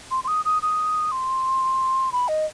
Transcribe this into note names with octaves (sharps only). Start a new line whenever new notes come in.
C6
C6
D#6
D#6
D#6
C6
B5
D#5